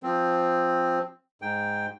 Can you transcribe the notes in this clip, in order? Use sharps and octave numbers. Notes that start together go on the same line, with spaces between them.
F3 C4
G#2 G5